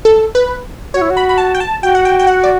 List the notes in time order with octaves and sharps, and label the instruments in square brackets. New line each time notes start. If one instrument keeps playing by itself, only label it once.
[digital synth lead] A4
B4
[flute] F#4 [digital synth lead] C#5
[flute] E4
F#4
[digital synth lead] B5
B5
A5
G5
A5
[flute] F#4 [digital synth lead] G5
[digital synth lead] F#5
G5
G5
F#5
D5